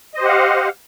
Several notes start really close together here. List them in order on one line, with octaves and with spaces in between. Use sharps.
D#5 C5 G4 F#5 F5